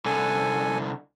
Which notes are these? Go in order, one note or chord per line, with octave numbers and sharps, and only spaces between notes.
C2 D3 A4 G#5